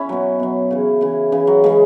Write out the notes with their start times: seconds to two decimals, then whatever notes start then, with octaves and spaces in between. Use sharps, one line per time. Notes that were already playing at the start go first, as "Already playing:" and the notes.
Already playing: C#4 E4
0.09 B2 F#3
0.40 B2 F#3
0.71 C#3 E3
1.01 C#3 E3
1.32 C#3 E3
1.47 F#3
1.64 C#3 E3 G#3